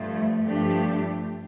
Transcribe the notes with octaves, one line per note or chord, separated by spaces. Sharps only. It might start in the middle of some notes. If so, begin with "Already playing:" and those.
Already playing: G2 F3 A3
G2 F3 A3 D4 G4